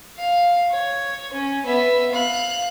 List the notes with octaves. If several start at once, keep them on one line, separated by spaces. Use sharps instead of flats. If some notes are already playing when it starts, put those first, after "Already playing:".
F5
C#5
C#4
B3 E5
F5 F#6